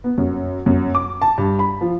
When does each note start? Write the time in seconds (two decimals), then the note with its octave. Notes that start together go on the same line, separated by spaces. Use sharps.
0.04 B3
0.18 F#2
0.66 F#2
0.95 D6
1.22 A5
1.38 G2
1.59 B5
1.81 F3